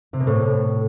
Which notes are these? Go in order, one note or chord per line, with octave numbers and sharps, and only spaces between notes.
C3
B2
A2